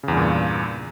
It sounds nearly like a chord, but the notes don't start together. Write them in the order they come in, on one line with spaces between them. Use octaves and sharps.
C#3 E2 G2 A#2